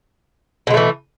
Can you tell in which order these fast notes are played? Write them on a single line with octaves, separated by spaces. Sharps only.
B2 G#3 A3 E3